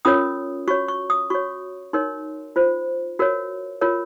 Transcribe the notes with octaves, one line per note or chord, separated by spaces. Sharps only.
C#4 F4 A#4 C#5 D#6
F#4 C#5 C#6
C#6
D#6
F#4 C#5 C#6
D#4 A#4 C#5 C6
F4 C5
F#4 A#4 C#5
F4 A#4 C#5